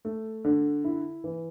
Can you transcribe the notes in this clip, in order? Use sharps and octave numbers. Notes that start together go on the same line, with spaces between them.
A3
D3
E4
E3